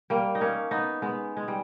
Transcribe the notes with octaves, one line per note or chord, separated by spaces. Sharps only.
G3 A#3
D#4
A#3 C#4
B3 D#4
G#3 B3
G#3
G3